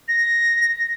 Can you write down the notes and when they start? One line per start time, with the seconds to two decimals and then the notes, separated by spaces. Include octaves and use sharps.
0.08 A#6